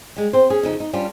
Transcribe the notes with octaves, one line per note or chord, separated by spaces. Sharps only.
G3 G#3
C4 C5
C#4 G#4
F2 C#3 D#4
D#4
G3 C#4 D4 F4